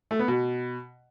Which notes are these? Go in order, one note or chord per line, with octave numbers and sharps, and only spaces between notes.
A3
B3
B2